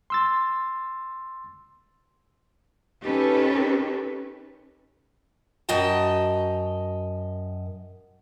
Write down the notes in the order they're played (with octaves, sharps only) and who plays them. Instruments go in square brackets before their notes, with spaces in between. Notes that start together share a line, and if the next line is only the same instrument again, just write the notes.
[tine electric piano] C6 E6 A6
[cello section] C#4 D#4 G4 A4 B4
[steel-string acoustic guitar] F#2 D#5 G5 A5